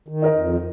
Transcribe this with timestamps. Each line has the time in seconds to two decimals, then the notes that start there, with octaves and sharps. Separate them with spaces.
0.08 D#3
0.22 D#4 A#4 D#5
0.36 F2